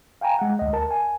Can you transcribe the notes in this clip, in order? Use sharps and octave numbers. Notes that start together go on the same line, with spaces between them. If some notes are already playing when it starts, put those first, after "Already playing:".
F5 G5 G#5 A#5
G#3 F#5
D2 D#5
A#4 A5
G#5